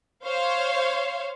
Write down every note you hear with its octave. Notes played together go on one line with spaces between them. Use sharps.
C5 C#5 F5